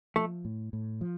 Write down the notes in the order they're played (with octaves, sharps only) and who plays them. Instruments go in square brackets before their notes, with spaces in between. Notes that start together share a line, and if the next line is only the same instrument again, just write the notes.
[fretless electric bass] F3 [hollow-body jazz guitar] A3
[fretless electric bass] A2
A2
F3